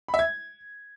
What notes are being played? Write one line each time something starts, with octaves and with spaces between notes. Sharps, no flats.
B5
E5
G#6